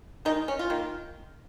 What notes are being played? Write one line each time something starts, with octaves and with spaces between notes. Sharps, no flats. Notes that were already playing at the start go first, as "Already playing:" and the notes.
D#3 G#3 D#4
C#4
F4
D#3 A#3